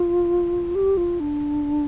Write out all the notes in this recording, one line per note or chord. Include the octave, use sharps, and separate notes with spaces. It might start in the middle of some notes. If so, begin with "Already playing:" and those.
Already playing: F4
G4
F4
D4